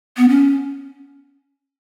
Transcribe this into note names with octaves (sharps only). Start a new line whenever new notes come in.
B3
C#4